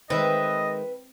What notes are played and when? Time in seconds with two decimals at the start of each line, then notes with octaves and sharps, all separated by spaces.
0.10 D#3 G#3 C4 B4 D#5 E5